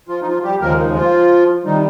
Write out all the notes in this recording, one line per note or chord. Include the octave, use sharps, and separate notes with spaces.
F3 F4
D#4
F3 F4
G3 G4
D#2 C#3 F3 G#3 A#3 A#4
D#4
F3 F4
C3 D#3 G3 D#4